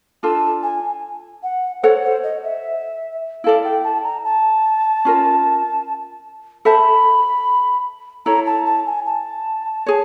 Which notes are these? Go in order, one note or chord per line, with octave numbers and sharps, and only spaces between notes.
D4 F4 A4 A5
G#5
F#5
A4 C5 C#5 F#5
C5
D#5
E5
E4 A4 D5 F5
G5
A5
A#5
A5
C#4 F4 A#4
A4 C5 E5 A5 B5
E4 A4 C#5 A#5
A5
A5
G#5
A5
G#4 C#5